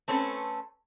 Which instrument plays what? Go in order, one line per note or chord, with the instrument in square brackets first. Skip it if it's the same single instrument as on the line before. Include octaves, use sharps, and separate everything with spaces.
[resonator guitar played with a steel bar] A3 C4 C#4 A4 B4